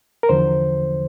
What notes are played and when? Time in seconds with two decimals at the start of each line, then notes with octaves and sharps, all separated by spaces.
0.23 A#4
0.29 E2 D3 F3 C5